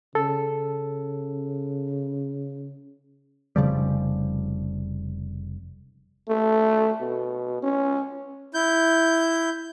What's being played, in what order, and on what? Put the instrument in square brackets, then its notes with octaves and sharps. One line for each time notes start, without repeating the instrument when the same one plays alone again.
[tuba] C#3 [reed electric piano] A4
[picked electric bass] F1 C#3 F3 G3
[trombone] A3
B2
C#4
[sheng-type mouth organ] E4 G6